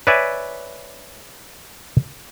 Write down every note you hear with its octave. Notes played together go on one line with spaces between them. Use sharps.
B4 C#5 D5 E5 G#5